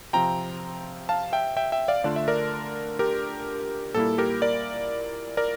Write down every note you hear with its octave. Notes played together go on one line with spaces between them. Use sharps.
C3 F3 C4 F4 G5 A#5
F5 A5
E5 G5
E5 G5
E5 G5
D5 F5
D3 A3 D4 F4 D5
E5
A#4 D5
G4 A#4
A#2 G3 A#3 E4 A4
G4 A#4
A#4 D5
A#4 D5